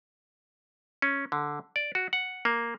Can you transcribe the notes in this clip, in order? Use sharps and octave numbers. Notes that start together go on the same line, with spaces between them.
C#4
D3
D5
F#4
F#5
A#3